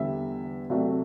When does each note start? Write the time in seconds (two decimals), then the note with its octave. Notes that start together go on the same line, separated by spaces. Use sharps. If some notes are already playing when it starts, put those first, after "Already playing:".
Already playing: E2 D3 G3 E5
0.70 C2 C3 F#3 A3